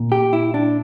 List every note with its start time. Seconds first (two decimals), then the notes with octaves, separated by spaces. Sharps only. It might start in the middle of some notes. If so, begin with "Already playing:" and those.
Already playing: A#2
0.12 G4
0.33 E4
0.54 D4